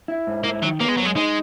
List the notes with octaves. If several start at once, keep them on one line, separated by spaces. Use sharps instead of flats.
E4
G#2
A#3 E4
D#3 F#3
A#3 B3
G#3
F#2 F#3
G#3
G#3 D#4